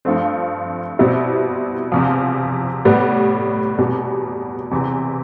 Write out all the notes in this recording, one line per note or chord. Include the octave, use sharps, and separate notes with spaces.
G2 F3 A3 C4
B2 G3 C4 E4
E2 C3 F3
A2 G3 B3
E2 B2 G3
E2 C3 E3